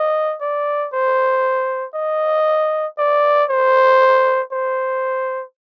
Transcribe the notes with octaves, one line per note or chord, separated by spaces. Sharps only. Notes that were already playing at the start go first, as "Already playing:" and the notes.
Already playing: D#5
D5
C5
D#5
D5
C5
C5